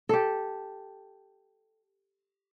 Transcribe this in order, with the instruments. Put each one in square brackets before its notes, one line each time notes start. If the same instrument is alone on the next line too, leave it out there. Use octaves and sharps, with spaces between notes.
[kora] G4 A4